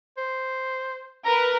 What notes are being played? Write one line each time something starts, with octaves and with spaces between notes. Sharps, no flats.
C5
A#4 B4 A#5